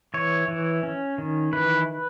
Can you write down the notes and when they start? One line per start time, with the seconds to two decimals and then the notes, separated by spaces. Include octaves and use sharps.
0.14 E3 C#5
0.48 E3
0.83 C#4
1.18 D#3
1.53 E3 B4